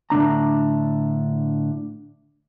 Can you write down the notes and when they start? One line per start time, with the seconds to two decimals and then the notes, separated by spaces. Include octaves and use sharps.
0.10 A2 D3 D4 A#5